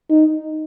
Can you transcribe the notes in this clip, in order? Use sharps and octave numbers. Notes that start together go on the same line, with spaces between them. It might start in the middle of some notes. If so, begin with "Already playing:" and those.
D#4